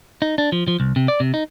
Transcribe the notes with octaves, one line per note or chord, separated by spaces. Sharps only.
D#4
D4
F3
F3
C2
C3
D5
C3
D#4